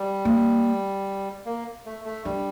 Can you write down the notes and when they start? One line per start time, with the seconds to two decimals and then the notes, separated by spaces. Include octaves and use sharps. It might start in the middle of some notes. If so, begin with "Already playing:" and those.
Already playing: G3
0.25 A#3
1.46 A#3
1.86 A3
2.05 A3
2.25 G3 D4